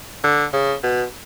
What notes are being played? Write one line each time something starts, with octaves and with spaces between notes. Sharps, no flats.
D3
C#3
B2